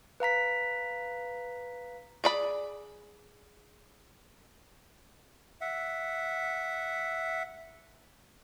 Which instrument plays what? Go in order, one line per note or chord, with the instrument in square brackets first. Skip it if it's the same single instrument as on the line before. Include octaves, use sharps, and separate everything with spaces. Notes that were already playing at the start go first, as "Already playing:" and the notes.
[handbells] B4 F5 A#5 B6
[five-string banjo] G#4 D5 B5
[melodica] E5 F#5